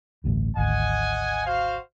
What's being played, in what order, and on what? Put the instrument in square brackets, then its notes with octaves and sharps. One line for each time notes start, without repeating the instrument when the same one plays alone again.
[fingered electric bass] A1 D2 G2
[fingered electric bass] G#1 D2 [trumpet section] D#5 F#5 G#5
[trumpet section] F#4 C5 F5